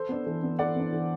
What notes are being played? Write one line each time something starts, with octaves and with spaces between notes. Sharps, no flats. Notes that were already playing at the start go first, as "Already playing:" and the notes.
Already playing: A4 C5
B3 D4
E3
B3 D4
E3 D5 F#5
B3 D4
E3